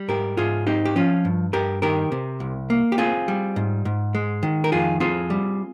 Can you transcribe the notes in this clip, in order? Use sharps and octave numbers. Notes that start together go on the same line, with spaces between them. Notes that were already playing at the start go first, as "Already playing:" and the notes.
Already playing: G3
G#2 G4 A#4
G#2 F4 G#4
C4 D#4 G4
G4
F3 C#4 F4
G2
G2 G4 A#4
D#3 G4 A#4
C3
C2
A#3
G4
C4 F4 G#4
G3
G#2
G#2
G#3
D#3
A#4
F2 F4 G#4
C4 F4 G#4
G3